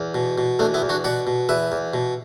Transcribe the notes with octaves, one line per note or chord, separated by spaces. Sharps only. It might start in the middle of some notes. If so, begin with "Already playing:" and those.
Already playing: E2
B2
B2
E2 A3 D4
B3 E4
E2
D4 F#4
B2 D5 F#5
B2
E2 B4 E5
E2
B2